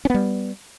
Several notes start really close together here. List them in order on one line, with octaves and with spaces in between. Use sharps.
C#4 B3 G3